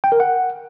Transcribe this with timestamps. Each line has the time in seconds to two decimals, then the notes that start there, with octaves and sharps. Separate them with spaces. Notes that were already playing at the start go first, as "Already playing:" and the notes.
0.04 G5
0.12 A#4
0.20 F#5